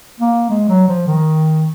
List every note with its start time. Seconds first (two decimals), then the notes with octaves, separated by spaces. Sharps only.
0.20 A#3
0.49 G#3
0.69 F#3
0.88 F3
1.07 D#3